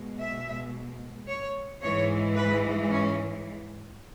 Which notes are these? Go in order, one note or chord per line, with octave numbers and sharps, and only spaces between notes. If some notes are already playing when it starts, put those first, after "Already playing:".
Already playing: B2 G#3
E5
C#5
G#2 E3 G#3 C#5
B4
C#4